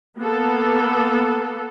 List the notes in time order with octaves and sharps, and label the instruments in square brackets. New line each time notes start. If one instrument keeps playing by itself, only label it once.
[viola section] A#3 B3 A4